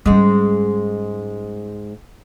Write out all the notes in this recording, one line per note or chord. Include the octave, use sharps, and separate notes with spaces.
G#2 G3 G#3 C#4